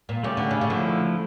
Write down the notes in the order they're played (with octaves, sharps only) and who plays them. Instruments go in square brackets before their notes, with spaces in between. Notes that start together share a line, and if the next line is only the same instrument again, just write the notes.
[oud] A#2
[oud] C#3 [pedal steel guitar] A3 C#4 G4 D5
[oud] D3
C#3
C#3
[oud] D3 [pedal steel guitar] F3 A3 E4